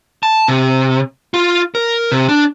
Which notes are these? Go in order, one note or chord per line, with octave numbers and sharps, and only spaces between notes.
A5
C3
F4
A#4
C3
D4